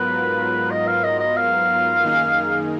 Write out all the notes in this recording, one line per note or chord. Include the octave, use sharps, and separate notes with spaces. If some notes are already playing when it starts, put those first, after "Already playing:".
Already playing: G#2 F#3 B3 F4 A#4 B4
D#5
F5
D#5
D#5
F5
F#2 D#3 A#3 D#4 G#4